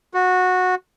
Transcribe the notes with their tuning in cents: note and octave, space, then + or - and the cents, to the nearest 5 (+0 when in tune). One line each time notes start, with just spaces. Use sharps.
F#4 -15